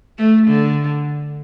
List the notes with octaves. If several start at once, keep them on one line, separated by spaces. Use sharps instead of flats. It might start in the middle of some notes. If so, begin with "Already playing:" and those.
A3
D3